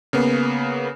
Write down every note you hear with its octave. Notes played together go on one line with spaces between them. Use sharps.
C#3 A#3 B3